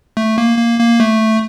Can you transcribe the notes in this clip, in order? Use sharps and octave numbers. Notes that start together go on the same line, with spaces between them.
A3
A#3
A#3
A#3
A3